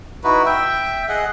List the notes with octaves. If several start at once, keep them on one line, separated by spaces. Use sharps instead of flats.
D#4 E4 F#4 B4
E5 G5
G#4 D#5 F#5